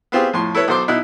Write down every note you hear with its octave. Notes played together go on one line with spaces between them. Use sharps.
B3 C4 F4 G4 G#4
F2 A2 C6
E4 A4 B4 C#5
B1 A4 C5 C6 D6
B2 D#4 E4 F#6